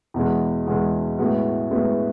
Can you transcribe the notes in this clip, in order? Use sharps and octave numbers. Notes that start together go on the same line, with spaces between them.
E2 B2 G#3
E2 B2 G#3
A2 G#3 B3 F#4
A2 G#3 B3 F#4